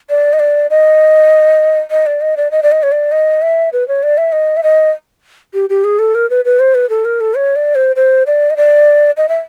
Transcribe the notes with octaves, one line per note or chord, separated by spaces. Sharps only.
D5
D#5
D5
D#5
D#5
D5
D#5
D5
D#5
D5
D#5
C#5
D5
D#5
E5
B4
C#5
D5
E5
D#5
E5
D#5
G4
G4
G#4
A4
A#4
B4
B4
C5
B4
A4
A#4
A4
C#5
D5
C5
C5
D5
D#5
D5
D#5
E5